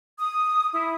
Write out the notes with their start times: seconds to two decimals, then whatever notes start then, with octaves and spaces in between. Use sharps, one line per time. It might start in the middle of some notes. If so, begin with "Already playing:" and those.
0.19 D#6
0.73 E4